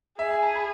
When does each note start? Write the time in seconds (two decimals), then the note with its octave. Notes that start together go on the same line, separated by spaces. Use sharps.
0.19 G#4 E5
0.31 G#5
0.43 A5
0.55 B5